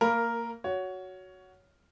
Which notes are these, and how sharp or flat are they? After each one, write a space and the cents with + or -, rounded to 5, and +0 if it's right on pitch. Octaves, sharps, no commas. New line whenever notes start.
A#3 -20 A#4 +0 B5 +0
F#4 +0 C#5 +15